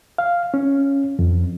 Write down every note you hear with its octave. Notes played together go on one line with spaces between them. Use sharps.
F5
C#4
F2